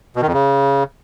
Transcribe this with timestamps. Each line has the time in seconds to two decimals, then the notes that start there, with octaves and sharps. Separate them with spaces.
0.16 B2
0.22 D#3
0.28 F2
0.33 C#3